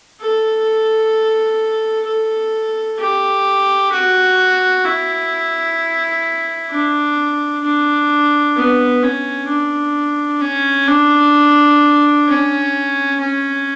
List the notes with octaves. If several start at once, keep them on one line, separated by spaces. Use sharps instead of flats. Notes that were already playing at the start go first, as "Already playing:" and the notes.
A4
A4
G4
F#4
E4
D4
D4
B3
C#4
D4
C#4
D4
C#4
C#4